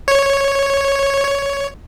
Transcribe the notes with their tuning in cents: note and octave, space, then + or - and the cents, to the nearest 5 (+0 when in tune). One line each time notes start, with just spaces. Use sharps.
C#5 -5
C#5 +10